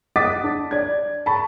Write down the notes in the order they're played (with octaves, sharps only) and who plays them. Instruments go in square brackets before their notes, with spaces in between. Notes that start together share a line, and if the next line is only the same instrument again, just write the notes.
[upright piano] D#5 F#5 D6 D#6 A6 B6
D4
D5 G#6
A5 B5 C#6